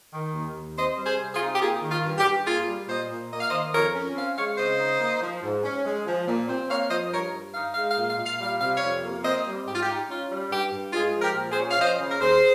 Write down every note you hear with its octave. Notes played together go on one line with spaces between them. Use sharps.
D#3
D#2
D#2
C4 C5 D#5
G3
G#4 C5
C3
F4 G#4
D#4
G4
A#3 F4 G#4
D#3
F4
G2
G4
G2
A#3 F4 G#4
G3
A#2 C5 D#5
A#2
A#3 D#5
F5
C5 D#5
D#3
F2 A#4 C#5
C#4
C4 F5
G#3 C#5 F5
C#3 C5 D#5
D#4
A#3
F3
G#2
C#4
G#3
F3
A#2
C4
A#3 C#5 F5
F3 C5 D#5
G2 A#4 C#5
G2
D#4 F5
G#3 F5
F5
A#2
F5
A#2
F5
G3 F5
C3 F5
C#5 F5
F2
A#3
C4 C5 D#5
G3
G#2 G4
F4
G4
D#4
C#4 F4
G3
G2 G4
G2
G#3 F4 G#4
F3
G4 A#4
A#2
G#4 C5
C#4
F5
F3 C5 D#5
C#3
A#4
D#2 G#4 C5